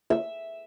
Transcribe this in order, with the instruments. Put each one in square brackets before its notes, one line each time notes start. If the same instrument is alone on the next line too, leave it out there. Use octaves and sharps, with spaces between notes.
[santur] E5